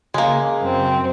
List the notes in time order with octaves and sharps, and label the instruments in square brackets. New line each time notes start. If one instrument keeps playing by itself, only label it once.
[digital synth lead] C#3 [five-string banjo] G#3 A#3
[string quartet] F#2 C4